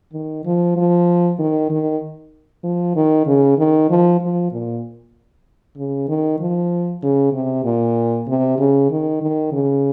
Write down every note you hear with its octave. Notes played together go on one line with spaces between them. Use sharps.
D#3
F3
F3
D#3
D#3
F3
D#3
C#3
D#3
F3
F3
A#2
C#3
D#3
F3
C#3
C3
A#2
C3
C#3
D#3
D#3
C#3